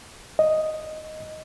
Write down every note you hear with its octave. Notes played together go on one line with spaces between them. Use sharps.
D#5